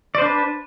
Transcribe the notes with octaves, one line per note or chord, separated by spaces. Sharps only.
D4 B4 C5 D5